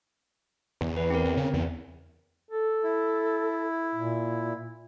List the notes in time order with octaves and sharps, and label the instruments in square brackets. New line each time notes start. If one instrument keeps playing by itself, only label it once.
[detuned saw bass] E2
[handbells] B4
C4 A#4
[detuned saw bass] E2
C#3
E2
[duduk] A4
[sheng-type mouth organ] E4
[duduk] A#2